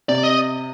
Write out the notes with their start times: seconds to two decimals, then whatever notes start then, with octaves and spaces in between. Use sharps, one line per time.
0.09 C3 D5
0.23 D#5